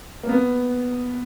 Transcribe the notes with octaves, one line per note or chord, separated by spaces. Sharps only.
A#3
B3